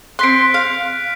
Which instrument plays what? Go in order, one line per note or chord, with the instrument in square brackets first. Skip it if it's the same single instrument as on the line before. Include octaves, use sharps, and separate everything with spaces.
[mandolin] C4 C6 [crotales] F#6 B6 D7
[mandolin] F5